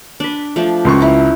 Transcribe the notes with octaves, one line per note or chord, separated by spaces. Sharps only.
D4 B4
F3 A3 D4
C#2 C6 C#6
E4 A#5